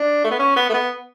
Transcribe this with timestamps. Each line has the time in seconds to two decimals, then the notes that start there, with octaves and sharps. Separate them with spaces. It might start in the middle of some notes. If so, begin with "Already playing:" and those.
Already playing: D4
0.24 A3
0.31 B3
0.39 C#4
0.56 B3
0.69 A3
0.74 B3